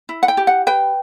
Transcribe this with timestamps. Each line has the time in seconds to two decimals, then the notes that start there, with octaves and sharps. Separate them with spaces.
0.09 E4
0.23 F#5
0.28 G5
0.37 G4
0.47 F#5
0.67 B4 G5